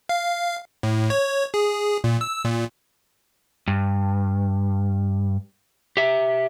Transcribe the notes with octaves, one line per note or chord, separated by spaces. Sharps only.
F5
A2
C#5
G#4
A#2
E6
A#2
G2
G4 E5